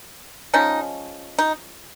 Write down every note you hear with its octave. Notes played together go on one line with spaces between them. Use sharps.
F3 G#3 C#4 D#4
D#4